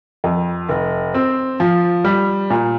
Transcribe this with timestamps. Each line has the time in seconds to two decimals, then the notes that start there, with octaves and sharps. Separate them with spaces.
0.24 F2
0.69 F1
1.14 C4
1.60 F3
2.05 G3
2.50 A#2